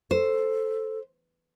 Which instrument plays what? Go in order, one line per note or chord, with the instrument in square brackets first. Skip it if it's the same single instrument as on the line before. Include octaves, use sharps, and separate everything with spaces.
[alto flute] A4 [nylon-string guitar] C5